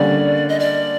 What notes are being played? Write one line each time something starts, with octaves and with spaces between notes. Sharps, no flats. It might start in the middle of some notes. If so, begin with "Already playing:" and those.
Already playing: D3 G3 A#3 C#4 D5
D#5
D5